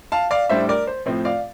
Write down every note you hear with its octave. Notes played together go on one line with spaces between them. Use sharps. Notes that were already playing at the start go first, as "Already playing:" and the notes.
F5 A5
D5 F5
A2 G3 D4 C5 E5
A#4 D5
C5
A2 F3 C4 C5
D5 F5